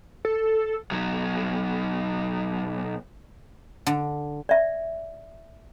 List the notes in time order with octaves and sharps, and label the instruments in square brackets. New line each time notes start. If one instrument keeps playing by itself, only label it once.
[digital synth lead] A4
[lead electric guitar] B1 F#3
[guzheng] D3
[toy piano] D5 E5